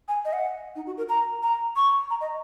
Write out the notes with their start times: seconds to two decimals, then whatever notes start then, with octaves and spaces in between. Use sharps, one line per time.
0.08 G#5
0.25 D#5
0.33 F#5
0.76 D#4
0.86 F#4
0.97 A#4
1.09 A#5
1.43 A#5
1.76 C#6
2.10 A#5
2.21 D#5